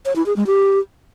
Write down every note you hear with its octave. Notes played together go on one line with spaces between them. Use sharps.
C#5
E4
G#4
G#3
G4